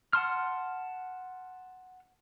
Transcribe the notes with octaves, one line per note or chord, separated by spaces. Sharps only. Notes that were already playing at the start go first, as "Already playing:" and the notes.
F#5 A5 C6 F6